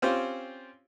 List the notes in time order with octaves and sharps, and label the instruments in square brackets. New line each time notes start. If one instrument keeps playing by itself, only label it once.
[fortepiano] C4 C#4 F4 G4 C5